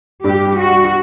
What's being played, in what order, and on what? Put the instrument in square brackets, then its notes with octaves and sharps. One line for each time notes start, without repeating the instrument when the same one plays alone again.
[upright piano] G2 [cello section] G4
[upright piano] G3
[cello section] F#4
[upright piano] G3